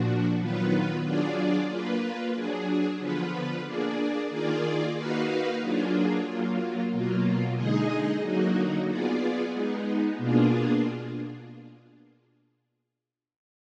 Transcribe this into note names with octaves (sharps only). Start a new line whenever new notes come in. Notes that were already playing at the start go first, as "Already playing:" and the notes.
Already playing: A#2 F3 D4 F#4
D#3 F#3 B3 F4 B4
F#3 D4 F4 G#4 D5
A#3 F4 B4
F#3 D4 G#4
D3 F3 B3 F4 B4
A#3 D4 G#4 D5
D#3 A#3 F4 G#4 D5
A#3 D#4 F#4 B4 F5
F#3 A#3 D4 F4 G#4
F#3 A#3 F4
B2 F#3 A#3 F4
D3 G#3 D#4 G#4 D#5
D3 F#3 A#3 D#4 F#4
B3 F4 G#4 D5
G#3 B3 D#4
B2 A#3 D4 F4 G#4